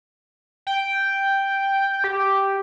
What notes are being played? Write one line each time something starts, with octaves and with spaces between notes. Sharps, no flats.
G5
G4